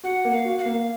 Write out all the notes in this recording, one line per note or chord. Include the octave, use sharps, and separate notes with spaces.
F#4 F#5
A#3
F#5
F5
F#4
F#5
A#3 F5